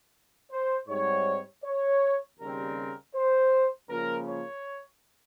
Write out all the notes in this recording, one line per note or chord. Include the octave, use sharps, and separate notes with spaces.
C5
G#2 G3 C4 C#5
C#5
D#2 C#3 G3 C4 A#4
C5
C#2 C#3 F3 A#3 A#4
C#5